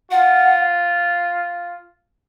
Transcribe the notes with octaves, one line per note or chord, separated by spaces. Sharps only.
F4 F#5